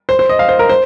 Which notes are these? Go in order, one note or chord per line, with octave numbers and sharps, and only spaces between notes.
C5
C5
D#5
F5
C5
A#4
C5